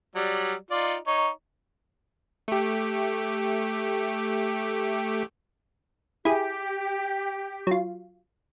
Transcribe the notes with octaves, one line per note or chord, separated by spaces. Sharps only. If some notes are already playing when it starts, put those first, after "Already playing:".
F#3 G3 D5
D#4 F4 D5
D#4 C#5
A3 G4
E4 G4 G#4
F#3 F4